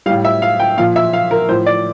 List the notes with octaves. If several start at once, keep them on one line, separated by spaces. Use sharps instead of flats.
A2 G3 F5
E5
F5
G5
A#2 F3 F5
E5
F5
A#4
A2 F3 C5
D5